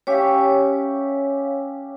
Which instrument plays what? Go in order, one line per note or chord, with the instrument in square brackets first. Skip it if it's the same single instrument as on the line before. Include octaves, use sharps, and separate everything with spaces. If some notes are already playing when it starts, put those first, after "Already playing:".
[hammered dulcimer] C#4 G4 E5 [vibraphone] C#5 F5